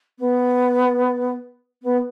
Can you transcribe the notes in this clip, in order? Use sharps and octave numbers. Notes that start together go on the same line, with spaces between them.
B3
B3